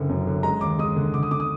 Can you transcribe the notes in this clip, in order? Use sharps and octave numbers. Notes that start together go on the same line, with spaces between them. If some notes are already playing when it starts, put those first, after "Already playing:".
Already playing: F#1 D3
F#2
D3
G#3 A#5
D#2 D6
G#3 D#6
D3
D3 D6
D#6
D3 D6
D#6